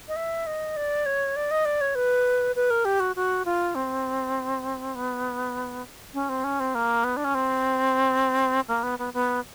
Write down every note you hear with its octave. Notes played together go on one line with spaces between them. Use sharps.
D#5
E5
D#5
D5
C#5
D5
D#5
D5
C#5
B4
B4
A#4
G4
F#4
F#4
F4
C4
B3
C#4
C4
C#4
C4
A#3
B3
D4
C#4
C4
A#3
B3
B3
B3